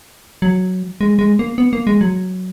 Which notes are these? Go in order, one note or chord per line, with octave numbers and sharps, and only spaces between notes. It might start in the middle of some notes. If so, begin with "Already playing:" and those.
F#3
G#3
G#3
A#3
B3
A#3
G#3
F#3